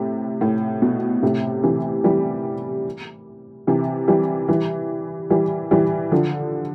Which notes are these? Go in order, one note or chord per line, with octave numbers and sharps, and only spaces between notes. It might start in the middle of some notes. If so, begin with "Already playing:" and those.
Already playing: A2 C3
A2
B2
A2 C3
C3 E3
E3 G3
C3 E3
E3 G3
E3 G3
E3 G3
E3 G3
D3 F3